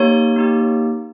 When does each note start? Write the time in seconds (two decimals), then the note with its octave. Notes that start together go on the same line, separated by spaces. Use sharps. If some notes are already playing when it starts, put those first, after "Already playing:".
Already playing: A#3 D#4 G4 C#5
0.36 A#3 D#4 G4